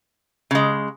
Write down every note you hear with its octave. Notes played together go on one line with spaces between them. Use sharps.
C#3 G#3